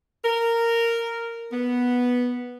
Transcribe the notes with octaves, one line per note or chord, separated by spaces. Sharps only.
A#4
B3